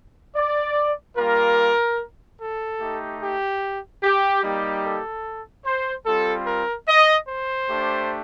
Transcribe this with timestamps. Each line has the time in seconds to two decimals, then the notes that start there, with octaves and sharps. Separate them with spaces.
0.36 D5
1.16 G3 A#3 F4 A#4
2.40 A4
2.80 A3 D#4 G4
3.21 G4
4.03 G4
4.43 G3 A#3 D#4 G4
4.84 A4
5.65 C5
6.06 G3 C4 F4 A4
6.46 A#4
6.88 D#5
7.28 C5
7.69 A3 D4 G4